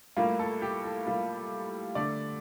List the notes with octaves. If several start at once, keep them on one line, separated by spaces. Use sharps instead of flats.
A2 G3 A#3 F4
A4
G4
A4
A2 G3 A#3 F4
D3 A3 D5